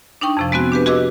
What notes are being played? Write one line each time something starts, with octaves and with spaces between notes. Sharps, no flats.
D4 D#4 G5 C#6
F2 C3 F3
G#3 B3 C4 F#4
D4 G4 B4
F#4 G#4 B4 D#5 D6 E6